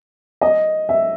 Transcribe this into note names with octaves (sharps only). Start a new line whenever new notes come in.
D#5
E5